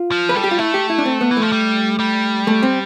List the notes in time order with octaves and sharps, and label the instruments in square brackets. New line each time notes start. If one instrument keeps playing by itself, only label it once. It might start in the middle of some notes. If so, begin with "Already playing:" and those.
Already playing: [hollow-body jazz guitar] F4
[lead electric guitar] F3
[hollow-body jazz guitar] B4
[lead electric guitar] G3 [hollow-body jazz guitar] A4
[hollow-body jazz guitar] G4
F4
[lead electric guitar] A3 [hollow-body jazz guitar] E4
[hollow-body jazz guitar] G4
E4
D4
C4
B3
[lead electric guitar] E3
[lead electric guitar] F3 [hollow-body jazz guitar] A3
[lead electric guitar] G3
G3
[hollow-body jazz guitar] A3
C4